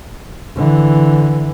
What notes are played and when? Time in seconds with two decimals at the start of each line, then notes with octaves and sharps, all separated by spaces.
0.56 D3 E3